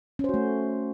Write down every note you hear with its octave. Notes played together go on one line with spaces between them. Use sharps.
A3 C#4 F#4 C5